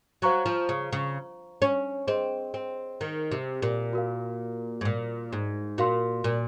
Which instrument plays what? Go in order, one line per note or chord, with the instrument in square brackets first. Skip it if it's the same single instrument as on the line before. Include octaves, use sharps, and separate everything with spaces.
[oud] F#3 [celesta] C5 F5 A#5 C#6
[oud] F3
C#3
C#3
C#4
[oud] C4 [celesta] G#4 C5 D#5
[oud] C4
D#3
C3
A#2
[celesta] F#4 A#4 F5
[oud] G#2
A#2
G#2
[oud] A#2 [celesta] F#4 A#4 F5 C6
[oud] A#2